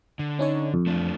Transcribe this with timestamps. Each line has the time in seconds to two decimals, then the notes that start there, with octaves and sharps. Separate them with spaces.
0.19 D3
0.39 C#4 D#4 C#5
0.74 F2
0.87 A3 D4 F4